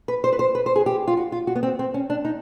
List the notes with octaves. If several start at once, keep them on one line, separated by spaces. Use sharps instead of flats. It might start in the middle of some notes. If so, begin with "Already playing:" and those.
B4
C5
B4
C5
B4
C5
G#4
G4
F4
F#4
F4
F#4
B3
C4
C4
C#4
D4
D#4